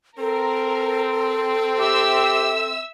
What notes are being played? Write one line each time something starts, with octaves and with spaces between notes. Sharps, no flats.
C4 A4 A#4
G4 E5 E6